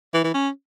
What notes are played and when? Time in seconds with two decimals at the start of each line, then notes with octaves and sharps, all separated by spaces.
0.14 E3
0.24 E3
0.34 C#4